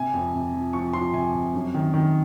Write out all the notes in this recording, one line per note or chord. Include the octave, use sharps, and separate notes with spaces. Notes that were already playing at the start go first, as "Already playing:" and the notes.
Already playing: C3 G#5
F2
C3
F3
F3 C#6
F3 C6
C3 G#5
C3
F#2
D#3
D#3